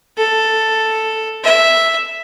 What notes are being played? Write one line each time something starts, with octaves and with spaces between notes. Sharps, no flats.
A4
E5